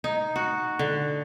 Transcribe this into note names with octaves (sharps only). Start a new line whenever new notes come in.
D#4
F#4
D3